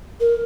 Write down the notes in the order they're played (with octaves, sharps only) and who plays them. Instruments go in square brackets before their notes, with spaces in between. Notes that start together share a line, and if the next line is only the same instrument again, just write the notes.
[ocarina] A#4